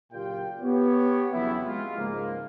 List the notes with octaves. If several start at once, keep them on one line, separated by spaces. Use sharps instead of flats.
F#1 A#2 F4 G4 G5
B3 G4 C#5
F2 C#3 E3 F#3 B3 E4
G#3 F4
C#2 G#2 F3 G#3 A#3